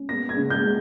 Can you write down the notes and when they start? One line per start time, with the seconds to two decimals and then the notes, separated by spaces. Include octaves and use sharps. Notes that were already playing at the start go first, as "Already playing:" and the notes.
Already playing: C#4
0.09 B3 A#6
0.29 G#6
0.36 C#3
0.50 G6
0.64 G#3